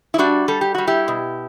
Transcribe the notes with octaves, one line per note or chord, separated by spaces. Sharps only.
E4
G3 D4 F#4
G3 A4
G4
G3 F#4
E4 G4
B2